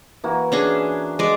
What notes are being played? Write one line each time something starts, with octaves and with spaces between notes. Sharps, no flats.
E3 A#3 F#4
C#4 D4 G#4
G#3 D5